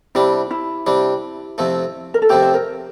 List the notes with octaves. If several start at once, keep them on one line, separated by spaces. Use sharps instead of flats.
C3 G3 D4 E4
E4
C3 G3 D4
F2 C3 F3 A3
A#4
A4
F2 C3 F3 A3 G4
C5
A#4